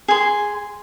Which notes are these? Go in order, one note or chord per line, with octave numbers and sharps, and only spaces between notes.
G#4 C6